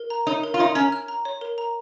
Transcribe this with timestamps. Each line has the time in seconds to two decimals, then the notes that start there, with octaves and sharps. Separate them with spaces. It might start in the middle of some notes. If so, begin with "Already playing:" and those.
Already playing: A#4
0.10 A#5
0.27 D#4 C#5
0.44 A#4
0.54 F4
0.59 D#4 C#5
0.75 C#4 A#5
0.92 F6
1.08 A#5
1.25 C#5
1.41 A#4
1.58 A#5